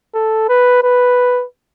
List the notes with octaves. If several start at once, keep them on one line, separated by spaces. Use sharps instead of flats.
A4
B4
B4